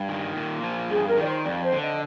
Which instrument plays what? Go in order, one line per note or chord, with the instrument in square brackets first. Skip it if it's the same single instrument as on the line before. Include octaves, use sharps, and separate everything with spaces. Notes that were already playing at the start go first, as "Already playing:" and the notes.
Already playing: [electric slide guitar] G2
D#3
A#2
F3
[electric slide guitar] G2 [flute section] G#4
[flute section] A#4
[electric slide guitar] D#3 [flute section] D5
[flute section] C5
[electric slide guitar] F2 [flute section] D5
[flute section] C5
[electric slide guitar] D3
[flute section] D#5